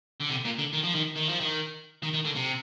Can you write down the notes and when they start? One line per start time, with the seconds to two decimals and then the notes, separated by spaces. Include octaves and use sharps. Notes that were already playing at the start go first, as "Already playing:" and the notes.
0.20 D3
0.30 C3
0.45 A#2
0.59 D3
0.73 D#3
0.84 F3
0.95 D#3
1.16 D#3
1.29 F3
1.40 D#3
2.03 D#3
2.13 D#3
2.25 D3
2.35 C3